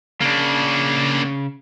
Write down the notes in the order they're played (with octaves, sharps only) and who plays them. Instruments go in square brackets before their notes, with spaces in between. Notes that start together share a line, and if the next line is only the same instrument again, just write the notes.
[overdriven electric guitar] C#3 [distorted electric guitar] A#3 D4